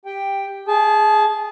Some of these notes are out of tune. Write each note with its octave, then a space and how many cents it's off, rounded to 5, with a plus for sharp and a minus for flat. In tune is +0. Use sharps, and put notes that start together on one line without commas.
G4 +10 G5 +0
G#4 +0 A5 -30